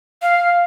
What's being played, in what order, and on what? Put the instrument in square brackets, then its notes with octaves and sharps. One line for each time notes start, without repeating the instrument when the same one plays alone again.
[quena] F5